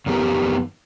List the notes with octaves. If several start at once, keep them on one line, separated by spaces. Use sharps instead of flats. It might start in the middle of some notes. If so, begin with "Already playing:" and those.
F#2 D#3 G3 B3 G4 A#4